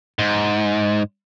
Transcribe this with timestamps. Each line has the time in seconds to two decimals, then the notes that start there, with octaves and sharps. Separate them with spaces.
0.19 G#2